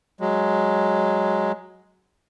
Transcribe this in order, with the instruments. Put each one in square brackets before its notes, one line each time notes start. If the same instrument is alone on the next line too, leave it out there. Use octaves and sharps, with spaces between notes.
[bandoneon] F#3 G#3